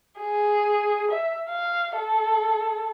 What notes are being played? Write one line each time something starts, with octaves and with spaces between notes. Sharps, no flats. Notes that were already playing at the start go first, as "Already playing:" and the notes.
G#4
E5
F5
A4